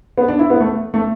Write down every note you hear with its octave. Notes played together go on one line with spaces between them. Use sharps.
B3
D4
E4
B3
A3
A3